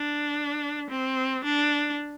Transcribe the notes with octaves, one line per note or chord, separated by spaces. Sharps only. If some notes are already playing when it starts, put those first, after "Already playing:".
Already playing: D4
C4
D4